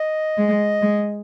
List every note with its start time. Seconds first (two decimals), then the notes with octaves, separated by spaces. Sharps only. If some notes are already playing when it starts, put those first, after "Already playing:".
Already playing: D#5
0.38 G#3
0.82 G#3